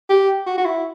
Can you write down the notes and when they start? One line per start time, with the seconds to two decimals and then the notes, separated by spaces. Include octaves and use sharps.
0.10 G4
0.46 F#4
0.58 F#4
0.65 E4